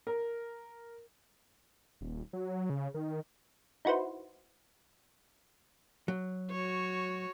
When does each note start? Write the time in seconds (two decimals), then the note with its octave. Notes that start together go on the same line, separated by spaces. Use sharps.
0.07 A#4
2.01 D#1
2.33 F#3
2.70 C#3
2.94 D#3
3.85 D#4 E4 F#4 B4 C5
6.08 F#3
6.51 F#4 C#5